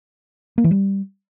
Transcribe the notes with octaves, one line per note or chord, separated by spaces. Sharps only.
A#3
E3
G3